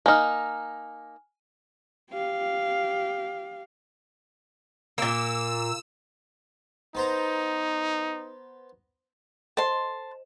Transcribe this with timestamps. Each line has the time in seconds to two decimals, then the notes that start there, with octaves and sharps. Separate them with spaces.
0.06 A#3 D#4 G#5 F6
2.11 G4 F5
4.98 A#2 A#3 E6
6.95 B3 D#4 C5 A#5
9.57 A4 C5 D#5 A5 C6